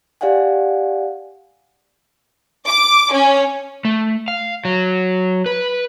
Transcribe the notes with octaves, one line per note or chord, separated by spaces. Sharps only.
G4 D5 F5 F#5 G#5
D6
C#4
A3
F5
F#3
B4